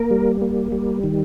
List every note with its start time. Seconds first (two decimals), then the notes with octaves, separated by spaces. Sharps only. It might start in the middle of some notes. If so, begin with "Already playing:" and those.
Already playing: A#3 A#4
0.11 G3
0.41 A#3
0.72 G3
1.04 D#3